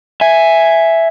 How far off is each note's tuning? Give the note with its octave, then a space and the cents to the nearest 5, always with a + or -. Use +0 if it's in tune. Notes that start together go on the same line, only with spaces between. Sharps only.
E5 +5 G#5 +0